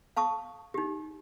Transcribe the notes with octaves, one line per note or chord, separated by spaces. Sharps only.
F5 A5 C#6 D#6
D#4 G4